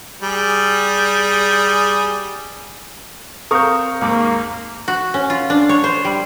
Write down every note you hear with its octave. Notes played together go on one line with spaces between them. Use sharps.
G3 G#4
C4 A4 A#4 F5 C#6 G6
D#2 G#2 A#3 D6
F#4
C#4
F4
D4
C#5
C5
G3